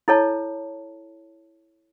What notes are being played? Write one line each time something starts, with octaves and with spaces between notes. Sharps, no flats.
E4 A4 C#5 A5